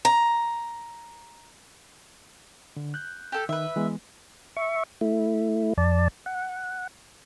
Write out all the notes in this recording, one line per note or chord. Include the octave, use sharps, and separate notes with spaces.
A#5
D3
F#6 G6
G4 A4
D#3 B4 E5
E3 G#3 B3
E5 C#6
A3 E4
F2 D5 A5
F#5